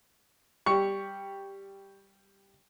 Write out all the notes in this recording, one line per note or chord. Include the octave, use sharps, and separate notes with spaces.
G3 G4 C#6